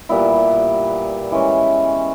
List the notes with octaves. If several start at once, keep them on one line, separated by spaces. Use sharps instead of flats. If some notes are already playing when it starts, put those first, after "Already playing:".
A#2 G3 B3 E4
E3 G#3 C#4